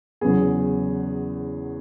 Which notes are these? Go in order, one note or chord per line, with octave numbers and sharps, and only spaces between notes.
E2 C#3 F#3 B3 G#4